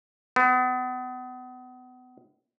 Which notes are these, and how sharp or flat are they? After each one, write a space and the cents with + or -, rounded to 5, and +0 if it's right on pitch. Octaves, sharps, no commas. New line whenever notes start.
B3 +35